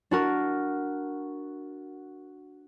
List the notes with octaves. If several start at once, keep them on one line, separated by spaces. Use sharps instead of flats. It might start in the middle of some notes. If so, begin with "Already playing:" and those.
D4 F#4 A#4